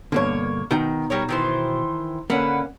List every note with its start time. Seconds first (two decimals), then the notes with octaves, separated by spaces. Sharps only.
0.12 G2 B2 D3 A#3 C#5
0.71 B2 D#3 D#4 G5
1.10 G3 A#4 C#5
1.29 D#3 E3 C5
2.30 D3 A#3 C#4 B4 F#5